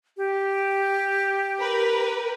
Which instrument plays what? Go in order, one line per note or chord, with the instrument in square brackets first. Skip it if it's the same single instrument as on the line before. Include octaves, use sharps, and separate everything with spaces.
[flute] G4
[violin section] A#4 B4